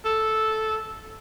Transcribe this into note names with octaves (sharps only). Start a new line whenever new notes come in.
A4